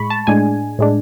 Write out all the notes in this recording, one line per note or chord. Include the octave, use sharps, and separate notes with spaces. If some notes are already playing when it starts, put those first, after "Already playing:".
Already playing: A2 G#3 B5 C#6
A5
A2 G#3 D4 G#5
A2 G#3 D4